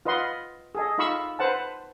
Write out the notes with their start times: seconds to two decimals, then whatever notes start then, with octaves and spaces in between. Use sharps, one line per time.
0.05 F4 B4 D#5 F#5 C6
0.75 G#4 A4 D#5
0.98 D#4 F4 F5 B5 C#6 E6
1.39 B4 C5 F#5 A5